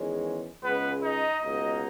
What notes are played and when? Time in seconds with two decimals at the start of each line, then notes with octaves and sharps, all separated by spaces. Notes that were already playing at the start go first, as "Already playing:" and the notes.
Already playing: E2 D#3 G#3 C#4
0.62 C#2 C#3 G#3 B3 B4
1.01 D#4 D#5
1.40 C#2 B2 A#3 D#4